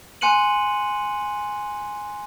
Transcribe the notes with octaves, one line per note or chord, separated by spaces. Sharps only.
G#5 C6 F#6 C#7 D#7 F#7